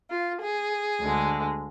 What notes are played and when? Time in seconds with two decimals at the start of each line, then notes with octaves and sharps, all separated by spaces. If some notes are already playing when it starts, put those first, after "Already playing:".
0.10 F4
0.41 G#4
1.00 D2 D3 G#3